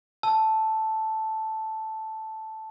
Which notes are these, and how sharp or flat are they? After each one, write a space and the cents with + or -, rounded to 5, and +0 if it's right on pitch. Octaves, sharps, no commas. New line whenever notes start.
A5 +0 E6 +0